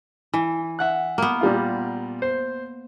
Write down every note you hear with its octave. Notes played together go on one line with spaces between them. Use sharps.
E3
E5 F#5 F#6
A#3 B3
A#2 G3 F4
C5